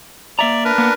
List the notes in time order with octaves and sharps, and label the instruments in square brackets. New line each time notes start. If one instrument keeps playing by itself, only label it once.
[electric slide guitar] A#3 E5 A#5 [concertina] D5
[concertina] D4 A#4 B4
[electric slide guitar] A#3 B3